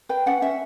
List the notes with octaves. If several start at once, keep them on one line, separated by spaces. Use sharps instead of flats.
B4 G5
C#4 F#5
C#4 E5